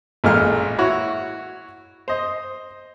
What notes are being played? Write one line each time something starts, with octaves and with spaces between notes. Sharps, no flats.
A1 A#2 G#3 F4 A4 F6
E4 F#4 C#5
C5 D#5